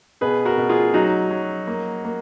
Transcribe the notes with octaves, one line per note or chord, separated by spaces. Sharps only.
B2 G#4 B4
F#4 A#4
B2
F4 G#4
F#3 D#4 F#4
F#3
A#3
A#3